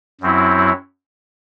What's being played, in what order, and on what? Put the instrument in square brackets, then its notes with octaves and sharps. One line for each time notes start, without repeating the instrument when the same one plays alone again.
[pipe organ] F#2 F#3 C4 E4